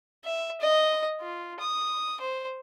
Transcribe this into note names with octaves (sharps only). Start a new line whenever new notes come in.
E5
D#5
F4
D#6
C5